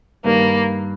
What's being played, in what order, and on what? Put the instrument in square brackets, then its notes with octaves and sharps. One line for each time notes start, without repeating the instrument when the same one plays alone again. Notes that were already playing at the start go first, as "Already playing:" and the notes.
[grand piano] G2 D#3 G3 [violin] A#3